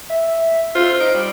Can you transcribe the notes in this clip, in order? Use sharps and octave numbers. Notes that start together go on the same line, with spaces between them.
E5
F4 C5
D#4 D7
G3